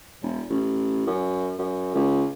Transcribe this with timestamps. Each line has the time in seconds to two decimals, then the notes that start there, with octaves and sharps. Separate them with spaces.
0.23 E1
0.50 A1
1.07 F#2
1.59 F#2
1.95 C#2